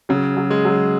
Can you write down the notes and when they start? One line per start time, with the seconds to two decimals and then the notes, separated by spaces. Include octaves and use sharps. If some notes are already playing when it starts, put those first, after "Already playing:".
0.09 C#3 F#3
0.36 F#3
0.51 G#3
0.65 F#3